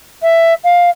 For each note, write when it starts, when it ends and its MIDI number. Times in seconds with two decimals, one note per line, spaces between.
0.22 0.53 76
0.64 0.89 77